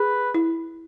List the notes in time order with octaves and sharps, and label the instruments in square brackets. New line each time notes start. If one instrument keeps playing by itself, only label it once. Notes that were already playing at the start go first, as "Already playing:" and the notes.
Already playing: [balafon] G#4 [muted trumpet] B4
[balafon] E4